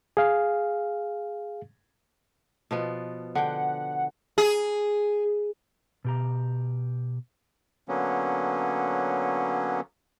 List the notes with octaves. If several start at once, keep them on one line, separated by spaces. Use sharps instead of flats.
G#4 F5
B2 F3 B3
D3 F#5 G5
G#4
B2 G4 A#5
D3 F#3 A#3 B3 C#4